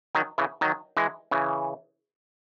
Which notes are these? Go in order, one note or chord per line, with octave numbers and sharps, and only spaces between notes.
D#3 F#3
C#3 E3
D#3 F#3
E3 G#3
C#3 E3